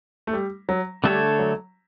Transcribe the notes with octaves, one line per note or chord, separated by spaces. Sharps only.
A3
G3
F#3
D3 G3 A3 D4 A4 C#5
F#3